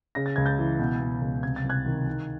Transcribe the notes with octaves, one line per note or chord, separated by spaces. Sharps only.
C#3 A#6
A6
C#2 G#6
G6 A6
E3
B2
B2
C#2
C3 G#6
A6
C2
F#6 G#6
D#3
D#3